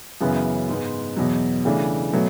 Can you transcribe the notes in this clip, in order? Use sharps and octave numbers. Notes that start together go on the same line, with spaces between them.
F#2 C#3 E3 B3
G#2 G#3 B3
E2 B2 F#3
C#3 E3 A3 D4
B2 F#3 A3